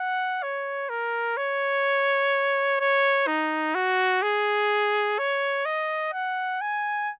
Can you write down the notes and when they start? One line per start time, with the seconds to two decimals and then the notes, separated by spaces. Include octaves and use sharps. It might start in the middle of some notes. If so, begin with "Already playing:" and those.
Already playing: F#5
0.43 C#5
0.89 A#4
1.37 C#5
2.80 C#5
3.27 D#4
3.75 F#4
4.23 G#4
5.19 C#5
5.65 D#5
6.13 F#5
6.61 G#5